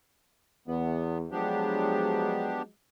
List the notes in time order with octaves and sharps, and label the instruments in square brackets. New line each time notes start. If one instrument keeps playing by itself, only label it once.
[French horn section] E2 [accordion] B3
[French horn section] F3 F#3 G#3 [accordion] B3 D4 G4